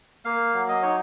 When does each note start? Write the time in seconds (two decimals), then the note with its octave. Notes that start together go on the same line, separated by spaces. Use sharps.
0.25 A#3 F5
0.54 F#3
0.69 D#5
0.82 D#4 C#5